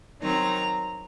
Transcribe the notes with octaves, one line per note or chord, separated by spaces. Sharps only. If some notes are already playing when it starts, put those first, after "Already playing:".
D#3 F#3 C4 D#4 A#5